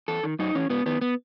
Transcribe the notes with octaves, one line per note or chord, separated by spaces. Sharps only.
E2 A4
D#3
F#2 D#4
E3 C#4
G#2 B3
D#3 B3
B3